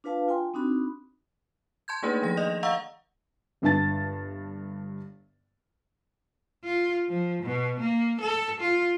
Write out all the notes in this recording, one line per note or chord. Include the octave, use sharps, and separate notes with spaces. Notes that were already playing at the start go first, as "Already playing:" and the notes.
D4 F4 B4 F5 A5
F4 G5 G#5 C6
C4 D4 D#4 F#4 B5
A5 C6 G6 G#6
A3 A#3 D4 D#4 G#4 B4
D#3 F3 G#4 A#6
D5 D#5 D#6
D#5 F5 F#5 A#5 C#6 E6
G1 G2 D4 A5 A6
F4
F3
B2
A#3
A4
F4